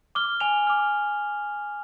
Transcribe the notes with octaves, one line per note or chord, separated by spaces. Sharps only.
D6 F6 G7
G#5 F7
D6 F6